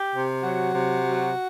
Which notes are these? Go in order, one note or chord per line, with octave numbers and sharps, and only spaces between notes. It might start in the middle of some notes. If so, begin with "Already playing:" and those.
Already playing: G4
C3
F#3 F#4
C3
F#3